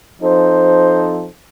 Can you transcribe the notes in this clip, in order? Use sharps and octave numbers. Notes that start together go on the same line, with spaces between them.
F3 C4 D#4 A4 C5